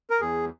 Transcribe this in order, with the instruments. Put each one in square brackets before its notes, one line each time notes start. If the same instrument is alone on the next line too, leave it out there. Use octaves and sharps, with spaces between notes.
[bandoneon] A#4
E2 G#4